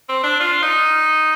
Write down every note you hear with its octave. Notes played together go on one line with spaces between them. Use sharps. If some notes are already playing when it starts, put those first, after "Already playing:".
C4
D4
F4
D#4